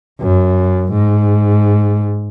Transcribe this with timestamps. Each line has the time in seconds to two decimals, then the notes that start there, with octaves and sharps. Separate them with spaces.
0.21 F#2
0.92 G#2